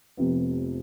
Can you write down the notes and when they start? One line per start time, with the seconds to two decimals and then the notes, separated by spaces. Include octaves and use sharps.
0.17 F1 F2 C3 F3 B3